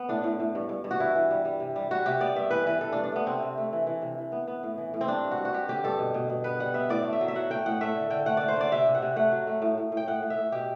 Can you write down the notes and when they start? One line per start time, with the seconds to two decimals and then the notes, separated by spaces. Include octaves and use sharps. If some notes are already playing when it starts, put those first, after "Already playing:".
Already playing: B3
0.09 A2 D4
0.24 A2
0.40 A2
0.55 G2
0.69 G2
0.84 G2
0.91 F#4
1.00 E3 E4
1.15 E3
1.31 G3
1.45 G3
1.60 C3
1.76 G3
1.91 G3 F#4
2.06 C3 G4
2.20 B3 D5
2.35 G2 E5
2.51 E3 B4
2.66 E3 B4
2.81 E3 A4
2.92 G2 D4
3.03 D4
3.12 A3 B3
3.26 C3 C4
3.42 C3
3.58 A3
3.73 E3
3.87 E3
4.02 C3
4.18 E3
4.32 B3
4.48 B3
4.63 A2
4.78 E3
4.94 A2
5.01 C4
5.08 G2 D4
5.24 G2
5.31 F#4
5.38 G2
5.45 F#4
5.53 G2 G4
5.68 D3 G4
5.84 G2 A4
5.98 B2
6.14 B2
6.30 B2
6.44 B3 B4
6.60 G3 F#5
6.74 B3 E5
6.89 A2 D5
7.04 A3
7.13 E5
7.21 F#3
7.28 E5
7.35 F#3 F#5
7.50 A3 G5
7.66 A2 F#5
7.81 A3 E5
7.96 D3
8.10 D3 G5
8.26 A3 F#5
8.37 A3 D5
8.48 C5
8.56 D3 D5
8.72 C3 E5
8.86 C3
8.95 F#5
9.02 C3
9.16 A3 F#5
9.32 F#3
9.47 A3
9.62 A2
9.78 A2
9.92 A2
9.97 G5
10.07 A2 F#5
10.22 A2
10.30 E5
10.38 A2
10.52 B2 G4